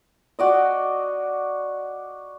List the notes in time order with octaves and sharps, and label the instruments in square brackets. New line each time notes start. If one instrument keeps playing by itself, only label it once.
[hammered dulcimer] F#4 D5 D#5